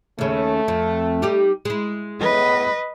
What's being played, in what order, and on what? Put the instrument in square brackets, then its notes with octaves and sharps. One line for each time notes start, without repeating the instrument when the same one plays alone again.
[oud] D#2 C#3 [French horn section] A3
[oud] F2
G3 D#4 G4
G#3 E4
[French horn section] A2 B3 [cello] B4 D#5